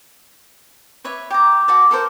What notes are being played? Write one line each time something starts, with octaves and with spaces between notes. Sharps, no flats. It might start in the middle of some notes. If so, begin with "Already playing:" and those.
B4 C#5 E5
G4 A#5
F#4 A4 D5
A4 A#4 C5